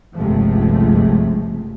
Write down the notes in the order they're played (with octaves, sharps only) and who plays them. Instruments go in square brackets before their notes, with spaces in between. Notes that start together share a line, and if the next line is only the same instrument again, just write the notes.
[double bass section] G1 C#2 C3 F3 G#3 A3